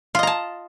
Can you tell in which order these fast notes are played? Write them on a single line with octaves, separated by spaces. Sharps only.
F4 D#5 A#5 A5